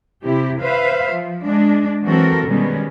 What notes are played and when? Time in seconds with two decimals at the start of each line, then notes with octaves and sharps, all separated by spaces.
0.23 C3 E4 G4
0.60 B4 C5 E5 F5
1.13 F3
1.44 G#3 D4
2.03 E3 F#3 C4 F#4 A4 A#4
2.46 B2 D#3 G3 G#3 B3 C#4